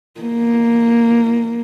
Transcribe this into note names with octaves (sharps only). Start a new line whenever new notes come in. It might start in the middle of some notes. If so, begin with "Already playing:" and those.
A#3